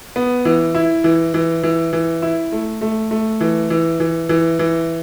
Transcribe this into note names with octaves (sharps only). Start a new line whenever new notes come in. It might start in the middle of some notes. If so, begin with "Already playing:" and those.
B3
E3
E4
E3
E3
E3
E3
E4
A3
A3
A3
E3
E3
E3
E3
E3